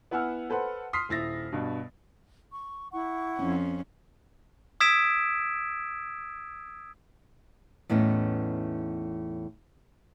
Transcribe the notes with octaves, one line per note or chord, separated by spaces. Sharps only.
B3 E4 F#5 G#5 E6 F6
A4 B4 C5 F#5
C6 D#6 F6 B6 C7
D#1 E4 A6 A#6
G2 B2
C#6
E4 F#5 C#6
F2 C#4
D#6 E6 G#6 B6 D7 E7
E2 A2 B3 C#4 D#4